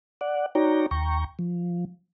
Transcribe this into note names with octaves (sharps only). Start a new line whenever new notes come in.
D5 F#5
D#4 F#4 C#5 D5 G5 A#5
D#2 G5 A#5 C#6
F3